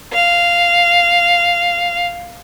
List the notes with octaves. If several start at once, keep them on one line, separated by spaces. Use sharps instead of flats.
F5